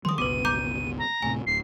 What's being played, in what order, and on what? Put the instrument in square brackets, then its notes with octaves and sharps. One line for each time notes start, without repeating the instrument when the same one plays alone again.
[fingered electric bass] D#3 F3 G3 [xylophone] C6 D#6
[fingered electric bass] G1 C#2 B2 [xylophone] B4 D6 [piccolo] D#7
[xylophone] A#5 D6 G6
[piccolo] A#5
[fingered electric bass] D1 A2 C3 [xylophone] G#5
[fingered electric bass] D1 [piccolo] C7